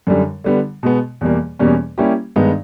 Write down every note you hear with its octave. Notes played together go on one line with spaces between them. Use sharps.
F#2 D3 G3
D3 G3 B3
B2 G#3 B3
E2 B2 G3 A#3
E2 B2 G3 A#3 C#4
G3 A#3 C#4 E4 G4
G2 D#3 G#3 B3 D#4